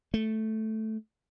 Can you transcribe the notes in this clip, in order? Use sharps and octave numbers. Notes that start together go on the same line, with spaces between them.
A3